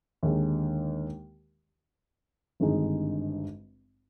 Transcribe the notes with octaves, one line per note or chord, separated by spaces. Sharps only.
D#2 D3 G#3 D#4
G#1 G2 D3 G#3 D#4